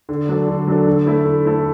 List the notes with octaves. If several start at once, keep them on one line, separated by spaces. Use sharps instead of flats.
D3
F#3 D4 A4
D3
F#3 D4 A4
D3
A3 E4 A4
D3
A3 E4 A4